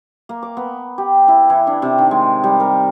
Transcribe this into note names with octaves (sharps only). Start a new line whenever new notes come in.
A#3
D6
B3
G4
E4
E3
D4
C3
D#3
G#3
G3
A#4